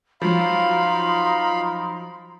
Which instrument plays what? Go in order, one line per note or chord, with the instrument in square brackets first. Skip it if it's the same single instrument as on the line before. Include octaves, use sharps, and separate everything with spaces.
[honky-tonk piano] F3 F#3 [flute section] D#4 F#4 C6 [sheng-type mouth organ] F5 B5